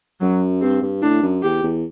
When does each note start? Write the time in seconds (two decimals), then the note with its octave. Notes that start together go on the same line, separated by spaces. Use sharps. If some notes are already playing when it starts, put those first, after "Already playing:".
0.21 F#2 F#3
0.61 G2 C4
0.82 G2
1.03 A2 D4
1.22 F#2
1.43 E2 G4
1.63 E2